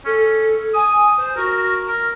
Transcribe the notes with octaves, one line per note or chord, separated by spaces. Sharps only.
C#4 A4
G#5 D#6
C5
F#4 A#4
A#4